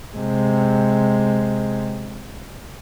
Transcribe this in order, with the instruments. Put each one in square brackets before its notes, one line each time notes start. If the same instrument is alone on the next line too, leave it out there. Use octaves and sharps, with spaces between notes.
[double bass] C3 G#3